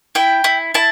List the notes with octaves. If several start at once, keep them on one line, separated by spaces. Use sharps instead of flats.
E4 G5
E4
E4 A5